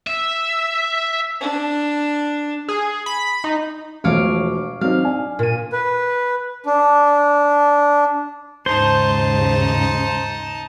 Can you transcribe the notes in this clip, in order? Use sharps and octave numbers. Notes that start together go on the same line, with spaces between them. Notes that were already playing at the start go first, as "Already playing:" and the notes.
E5
D4
G#4
B5
D#4
E1 F3 A3 C#5 F5 D6
F#3 C4 D#4 F5
D4 G#5
A#2 D#7
B4
D4
D#2 G#2 C#3 D#4 C5 A5